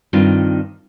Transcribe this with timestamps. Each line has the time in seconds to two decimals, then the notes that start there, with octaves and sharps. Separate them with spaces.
0.13 G2 D#3 C4 F4